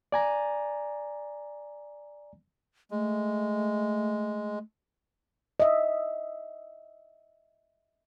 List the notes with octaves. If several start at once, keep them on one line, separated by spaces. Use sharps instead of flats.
D5 G#5 A#5
G#3 A3
D#5 E5